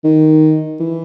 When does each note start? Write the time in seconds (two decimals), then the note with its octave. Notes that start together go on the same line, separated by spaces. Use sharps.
0.04 D#3
0.80 E3